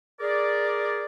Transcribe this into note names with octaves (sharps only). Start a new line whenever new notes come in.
G#4 A#4 D5